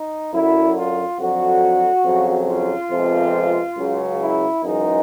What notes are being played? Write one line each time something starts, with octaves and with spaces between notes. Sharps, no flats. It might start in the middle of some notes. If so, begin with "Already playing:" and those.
Already playing: D#4
F#2 D3 F#3 E4
F4
F2 D3 F#3 F#4
F2 C#3 F#3
F4
F2 C3 F3 G#3 B3
C#2 C#3 F#3
E4
F#2 C#3 E3 G#3 D#4